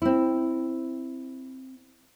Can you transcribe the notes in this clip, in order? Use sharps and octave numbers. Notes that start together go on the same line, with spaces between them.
C4 E4